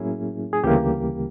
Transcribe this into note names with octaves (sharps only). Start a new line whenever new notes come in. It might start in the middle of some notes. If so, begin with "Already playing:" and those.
Already playing: A2 F#3 A#3 C#4 E4 G#4
G#4
D2 C#3 E3 G3 A#3 G4